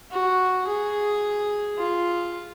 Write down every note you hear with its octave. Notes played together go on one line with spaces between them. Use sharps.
F#4
G#4
F4